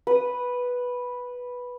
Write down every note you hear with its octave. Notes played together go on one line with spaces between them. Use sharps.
B4 D#6